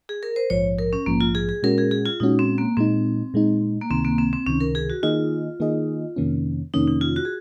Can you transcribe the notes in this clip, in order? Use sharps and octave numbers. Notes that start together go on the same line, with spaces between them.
G#4
A#4
C5
A#1 G#2 F3 C#5
A#4
C#4
A#1 G#2 F3 A#3
F4
G#4
G#4
A#2 G#3 C#4 F#4 A#4
G#4
G#4
F4
A#2 G#3 C#4 D#4 F#4
C4
A#3
A#2 G#3 C4 D#4
A#2 G#3 D#4
A#3
C#2 C3 D#3 C4
A#3
C4
C4
C#2 C3 D#3 C#4
A#4
G#4
F#4
D#3 A#3 D#4 F4 G#4 D#5
D#3 A#3 D#4 G#4 D#5
F2 C3 D#3 A#3 C#4
F2 C3 D#3 A#3 C#4 D#4
D#4
F4
F#4
G#4